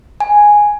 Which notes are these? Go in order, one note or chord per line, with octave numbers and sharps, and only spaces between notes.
G#5